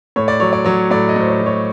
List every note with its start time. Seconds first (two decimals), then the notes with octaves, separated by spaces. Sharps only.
0.16 A2 C#5
0.28 D5
0.40 F#3 C#5
0.53 D5
0.65 F#3 C#5
0.91 A2 D5
1.09 D#5
1.16 A2 C5
1.28 C#5
1.40 F#3
1.46 C#5